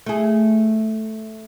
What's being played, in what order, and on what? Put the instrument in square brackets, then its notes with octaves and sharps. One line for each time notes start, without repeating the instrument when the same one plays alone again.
[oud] A3 G#4